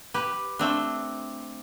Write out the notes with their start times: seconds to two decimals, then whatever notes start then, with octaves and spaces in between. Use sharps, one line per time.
0.14 G4 B4
0.59 A3 C4 D4